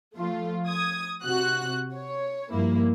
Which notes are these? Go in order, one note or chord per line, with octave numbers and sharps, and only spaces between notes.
F3 A3 F4
D#6 G#6
C3 F#4 F#6
C#5
G2 F3 A#3 E4